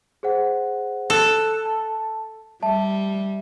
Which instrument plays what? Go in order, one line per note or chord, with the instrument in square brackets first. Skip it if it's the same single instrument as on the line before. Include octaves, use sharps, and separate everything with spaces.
[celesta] G#4 C5 F#5
[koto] A4 [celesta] F#6
[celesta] A5
[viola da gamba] G3 [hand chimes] E5 [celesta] A5